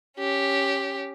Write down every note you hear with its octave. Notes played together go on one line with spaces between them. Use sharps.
C#4 G4